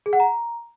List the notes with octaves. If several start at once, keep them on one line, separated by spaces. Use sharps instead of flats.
G#4
F#5
A#5